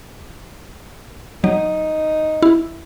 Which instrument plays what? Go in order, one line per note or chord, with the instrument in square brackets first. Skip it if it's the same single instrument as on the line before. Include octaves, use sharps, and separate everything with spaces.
[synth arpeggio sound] F#3 [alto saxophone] D#4
[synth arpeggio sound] E4